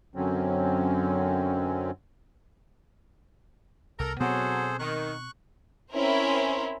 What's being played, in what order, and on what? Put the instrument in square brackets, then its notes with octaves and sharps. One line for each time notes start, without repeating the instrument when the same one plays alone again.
[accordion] F#2 D3 F#3 C4 C#4
[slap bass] C2 [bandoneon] A4 A#5 [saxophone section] A#4
[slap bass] B2 B3 C4 [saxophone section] F#3 [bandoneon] G#4 A4 C5
[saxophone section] D#3 [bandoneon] C#6 F#6
[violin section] C4 C#4 E4 A#4 C5